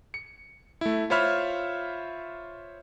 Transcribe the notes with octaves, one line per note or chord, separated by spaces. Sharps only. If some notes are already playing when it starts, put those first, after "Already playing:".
C#7
A3 E4
F4 C5 C#5 E5 B5 F6